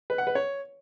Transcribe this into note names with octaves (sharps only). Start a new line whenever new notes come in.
B4
F#5
B4
C#5